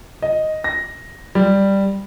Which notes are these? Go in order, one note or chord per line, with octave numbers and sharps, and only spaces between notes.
D#5
A#6
G3